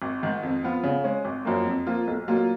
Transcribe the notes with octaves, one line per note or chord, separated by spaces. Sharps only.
G#1
G#2 D#3
F2
F3 B3 F4
C#3
G#3 C#4
G#1
F#2 F3 A#3
F2
F3 A#3 F4
B1
A#2 F#3 A#3 F4